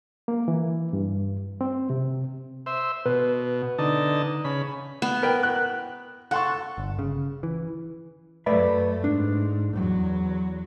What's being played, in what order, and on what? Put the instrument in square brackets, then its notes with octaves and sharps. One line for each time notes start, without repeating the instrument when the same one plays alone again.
[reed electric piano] A#3
E3
G2
C4
C3
[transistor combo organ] C5 E5
[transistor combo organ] B2 [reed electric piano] B4
[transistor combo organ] D3 D#4 A5
C#3 B5
[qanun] B3
[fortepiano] A#4 B4 G5
F#6
[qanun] A4 [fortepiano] F#5 C6 C#6
[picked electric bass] G1
C#3
E3
[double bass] F#2 A3 [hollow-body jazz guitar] B4 D5 E5
[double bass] G#2 [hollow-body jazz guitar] D4
[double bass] E2 F#3